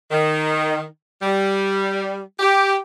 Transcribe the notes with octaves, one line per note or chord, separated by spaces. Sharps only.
D#3
G3
G4